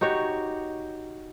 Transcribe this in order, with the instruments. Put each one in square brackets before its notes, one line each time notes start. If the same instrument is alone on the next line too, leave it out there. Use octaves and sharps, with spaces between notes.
[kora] D#4 F#4 G4 C#5